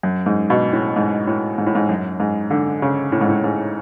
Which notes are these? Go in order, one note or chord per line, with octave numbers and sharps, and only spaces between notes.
F#2
G#2
B2
A2
G#2
A2
G#2
A2
G#2
F#2
G#2
D3
C#3
A2
G#2
A2
G#2